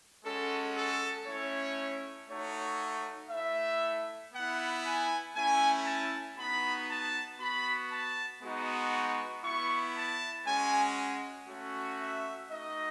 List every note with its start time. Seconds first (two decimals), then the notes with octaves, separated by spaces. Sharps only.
0.24 G#3 C#4 F#4 A4
0.77 A4
1.27 A3 C#4 E4 C#5
2.29 A3 D#4 F#4 C#5
3.31 A3 E4 E5
4.33 B3 E4 F#5
4.84 G#5
5.36 A3 C#4 E4 G#5
5.86 A5
6.37 B3 D#4 F#4 B5
6.90 A5
7.39 B3 F#4 B5
7.91 A5
8.42 G#3 B3 D#4 F#4
8.93 C#6
9.44 B3 E4 C#6
9.95 A5
10.47 G#3 C#4 F#4 G#5
11.48 A3 C#4 F#4
12.00 E5
12.50 A3 D#4 F#4 D#5